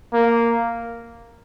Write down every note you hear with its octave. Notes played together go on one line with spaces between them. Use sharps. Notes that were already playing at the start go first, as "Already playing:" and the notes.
A#3